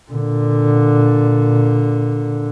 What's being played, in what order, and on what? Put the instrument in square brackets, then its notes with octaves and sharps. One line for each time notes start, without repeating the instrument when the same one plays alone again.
[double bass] A#2 D3